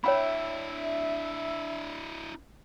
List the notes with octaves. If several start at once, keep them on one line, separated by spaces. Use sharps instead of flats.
D4 E4 C#5 E5 G5 B5